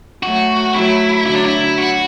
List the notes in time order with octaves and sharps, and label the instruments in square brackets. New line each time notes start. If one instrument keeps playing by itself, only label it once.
[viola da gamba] F#3 A3 [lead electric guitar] F#4
[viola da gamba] F#3 A3 [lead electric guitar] E4
[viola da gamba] D3 F#3 [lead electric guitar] E4
[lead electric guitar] D4
E4
F#4